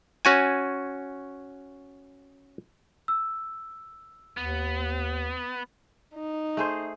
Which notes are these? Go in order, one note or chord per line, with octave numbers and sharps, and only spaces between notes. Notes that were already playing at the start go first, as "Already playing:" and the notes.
C#4 F#4 G#5
E6
D#2 B3
D#4
A3 G#4 C5